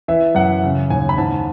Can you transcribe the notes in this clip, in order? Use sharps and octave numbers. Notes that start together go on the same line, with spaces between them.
E3 E5
F#2 F#5
C#3
D#2 G#5
B5
G#2 A5